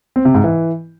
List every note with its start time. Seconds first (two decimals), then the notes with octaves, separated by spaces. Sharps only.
0.16 C4
0.25 C3
0.34 G#2
0.44 E3